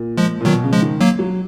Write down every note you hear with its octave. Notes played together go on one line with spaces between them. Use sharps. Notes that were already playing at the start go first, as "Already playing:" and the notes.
Already playing: A#2
F3 G#3
A#2
B2 D#3 F#3
C#3
F3 G#3
D#3
F#3 A#3
F#3